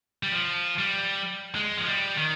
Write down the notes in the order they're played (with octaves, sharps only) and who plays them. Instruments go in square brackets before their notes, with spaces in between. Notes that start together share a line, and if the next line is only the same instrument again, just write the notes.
[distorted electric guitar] G3
F3
G3
G#3
F3
G3
D#3